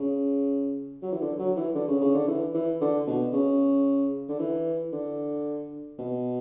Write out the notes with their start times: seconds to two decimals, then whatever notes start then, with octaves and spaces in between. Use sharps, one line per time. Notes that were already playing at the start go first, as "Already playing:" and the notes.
Already playing: C#3
1.02 F#3
1.12 E3
1.22 D3
1.39 F#3
1.57 E3
1.75 D3
1.88 C#3
2.01 C#3
2.14 D3
2.27 E3
2.54 E3
2.81 D3
3.07 B2
3.33 C#3
4.29 D3
4.39 E3
4.93 D3
5.99 B2